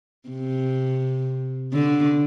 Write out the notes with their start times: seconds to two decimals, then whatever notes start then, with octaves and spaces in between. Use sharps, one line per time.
0.28 C3
1.73 D3